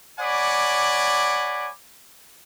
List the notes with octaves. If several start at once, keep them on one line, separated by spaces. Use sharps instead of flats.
C#5 D5 F#5 G#5 B5 D6